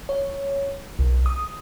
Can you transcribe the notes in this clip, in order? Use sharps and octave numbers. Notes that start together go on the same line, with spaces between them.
C#5
B1
D#6